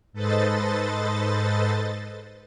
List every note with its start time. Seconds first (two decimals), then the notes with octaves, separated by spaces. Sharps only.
0.12 G#2 A4 B4 C5 D#5 A6